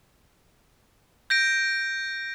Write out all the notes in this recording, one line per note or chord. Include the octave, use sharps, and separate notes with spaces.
G6 A#6 D7